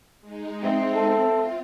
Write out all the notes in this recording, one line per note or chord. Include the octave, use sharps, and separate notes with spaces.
G#3 D#4
C4 E5
A4
F4